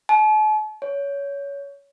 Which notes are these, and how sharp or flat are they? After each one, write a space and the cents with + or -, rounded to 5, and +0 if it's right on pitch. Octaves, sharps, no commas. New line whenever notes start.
A5 -45
C#5 +20